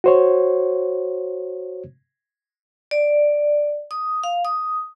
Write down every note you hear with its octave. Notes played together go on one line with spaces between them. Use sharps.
F#4 C5 C#5
D5
D#6
F5
D#6